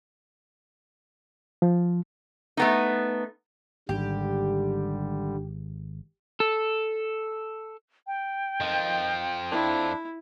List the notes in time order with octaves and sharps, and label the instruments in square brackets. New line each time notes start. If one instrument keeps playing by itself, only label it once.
[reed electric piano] F3
[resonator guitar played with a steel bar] A3 B3 D#4
[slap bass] G#1 G#2 [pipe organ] D3 G3 [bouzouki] G4
[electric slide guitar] A4
[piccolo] G5
[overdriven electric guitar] F2 F3 [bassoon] D#3
[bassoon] D4 [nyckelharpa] E4